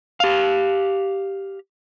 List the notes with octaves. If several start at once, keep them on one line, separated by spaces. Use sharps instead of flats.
G4 F5